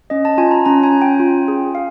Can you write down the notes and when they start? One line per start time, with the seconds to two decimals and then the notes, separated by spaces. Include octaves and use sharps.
0.10 C#4 D#5
0.25 A5
0.38 F4 G#5
0.51 A#5
0.65 C#4 A#5
0.83 G#5
0.92 C#4
1.02 G5
1.20 F4
1.48 G#4
1.75 F5